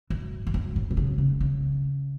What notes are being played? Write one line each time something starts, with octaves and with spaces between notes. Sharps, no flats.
F#2
E2
F#2
A2
B2
C#3
C#3
C#3